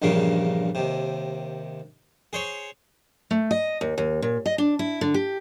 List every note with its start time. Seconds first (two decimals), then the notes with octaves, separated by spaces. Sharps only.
0.02 A#1 E2 G2 A#2 C#3 A#3
0.75 D#2 C3
2.33 G#4 C5 C#5
3.31 A3
3.51 D#5
3.81 D#2
3.98 D#2
4.22 A#2
4.46 D#5
4.58 D4
4.79 E4
5.01 D3
5.14 G4